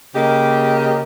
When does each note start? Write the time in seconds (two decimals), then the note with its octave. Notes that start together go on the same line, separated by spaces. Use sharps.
0.15 C#3 A#3 G4 D#5